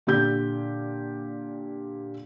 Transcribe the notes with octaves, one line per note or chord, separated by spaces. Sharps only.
A#2 D3 G4 G6